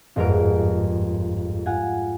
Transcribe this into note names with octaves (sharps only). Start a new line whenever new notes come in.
G1 F2 G#2 A#4 F6 D7
F4 F#5 G#5